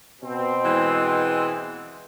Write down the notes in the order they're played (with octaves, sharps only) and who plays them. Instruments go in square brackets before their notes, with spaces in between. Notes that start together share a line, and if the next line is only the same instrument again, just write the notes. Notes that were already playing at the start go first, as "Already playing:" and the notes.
[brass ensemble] B2 C4
[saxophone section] E3 G#3